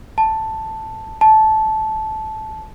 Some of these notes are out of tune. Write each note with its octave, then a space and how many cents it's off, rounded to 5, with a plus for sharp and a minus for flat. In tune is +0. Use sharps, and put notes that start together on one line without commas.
A5 +5
A5 -15